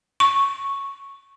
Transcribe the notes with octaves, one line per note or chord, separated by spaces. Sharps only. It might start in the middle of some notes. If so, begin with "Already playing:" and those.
C#6